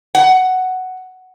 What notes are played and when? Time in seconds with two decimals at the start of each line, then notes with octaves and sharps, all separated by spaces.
0.15 F#5